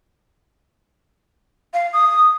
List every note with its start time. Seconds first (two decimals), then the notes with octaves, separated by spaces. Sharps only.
1.74 F5
1.93 D#6